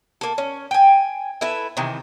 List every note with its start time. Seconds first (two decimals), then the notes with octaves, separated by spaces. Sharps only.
0.21 A#3 A4
0.38 C#4
0.71 G5 G#5
1.41 E4 A4 B4 E5
1.77 C3 D#3 E3